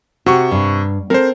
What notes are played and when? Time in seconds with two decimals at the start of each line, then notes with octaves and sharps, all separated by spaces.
0.26 C3 F#4 C#6
0.51 G2
1.10 C4 A4 A#4 C5